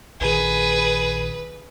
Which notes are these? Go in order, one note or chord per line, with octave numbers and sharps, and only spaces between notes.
A#1 D#3 G#4 B4